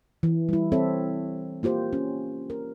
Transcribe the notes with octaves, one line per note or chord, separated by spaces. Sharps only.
E3
G3 E4
C4 A4 C#5 E5
A#3 F4 G4 C5
C#4
A#4